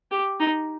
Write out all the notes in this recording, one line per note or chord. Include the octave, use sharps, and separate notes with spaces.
G4
D#4